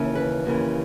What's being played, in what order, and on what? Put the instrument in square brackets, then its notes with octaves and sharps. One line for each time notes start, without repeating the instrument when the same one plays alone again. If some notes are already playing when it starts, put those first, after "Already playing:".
Already playing: [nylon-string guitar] D#2 C#3 E3
B4
D#2 C#3 E3